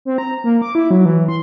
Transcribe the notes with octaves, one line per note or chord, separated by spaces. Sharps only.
C4
A#5
A#3
D6
E4
F#3
E3
C6